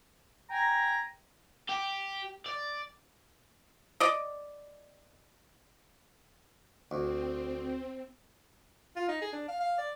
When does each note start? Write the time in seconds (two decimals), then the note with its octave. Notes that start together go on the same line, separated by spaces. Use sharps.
0.50 G5 G#5 A#5
1.69 G4
2.46 D5
4.00 D5 D#5
6.91 D2 C4
8.96 F4
9.09 D#4
9.21 G#4
9.33 D4
9.48 F5
9.60 F5
9.78 D5